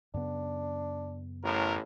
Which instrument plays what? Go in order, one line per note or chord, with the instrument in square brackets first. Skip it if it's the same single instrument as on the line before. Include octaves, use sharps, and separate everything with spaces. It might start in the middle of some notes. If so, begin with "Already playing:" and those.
[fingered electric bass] F#2 C#3 B3 [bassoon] D4
[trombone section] A1 A2 [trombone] A#4